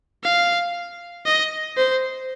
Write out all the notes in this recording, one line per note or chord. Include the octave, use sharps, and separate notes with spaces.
F5
D#5
C5